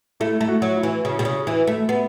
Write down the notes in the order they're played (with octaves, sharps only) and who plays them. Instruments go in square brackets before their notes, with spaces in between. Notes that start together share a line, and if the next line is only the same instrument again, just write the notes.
[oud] A3 [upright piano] E4
[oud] A3
[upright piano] F#4
[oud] F#3
[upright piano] E4
[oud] E3
C#3
B2
C#3
E3
A3
B3